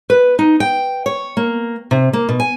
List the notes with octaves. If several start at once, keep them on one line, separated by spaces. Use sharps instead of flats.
B4
D#4
G5
C#5
A#3
C3
A#3
B2
G#5